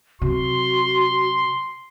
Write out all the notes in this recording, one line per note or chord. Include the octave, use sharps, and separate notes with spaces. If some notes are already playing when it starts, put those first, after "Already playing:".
C3 F#3 F#4 C6